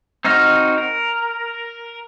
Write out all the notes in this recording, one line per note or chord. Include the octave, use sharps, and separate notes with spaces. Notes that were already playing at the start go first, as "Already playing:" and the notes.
C4 D#4 F#4 D#5 F6
A#4